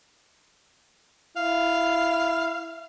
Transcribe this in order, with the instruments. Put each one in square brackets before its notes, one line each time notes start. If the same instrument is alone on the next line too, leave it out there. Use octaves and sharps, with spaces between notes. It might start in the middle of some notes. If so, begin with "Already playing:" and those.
[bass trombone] E4 [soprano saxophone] F5